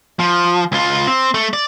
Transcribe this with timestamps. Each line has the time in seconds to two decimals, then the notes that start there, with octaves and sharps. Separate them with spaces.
0.19 F3
0.72 C#2 F4
1.07 C4
1.34 A3
1.53 D5